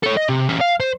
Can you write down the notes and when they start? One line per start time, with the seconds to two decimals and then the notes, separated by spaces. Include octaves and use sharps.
0.03 A4 C#5
0.17 D#5
0.29 C3
0.49 C#4 G4
0.61 F5
0.80 C5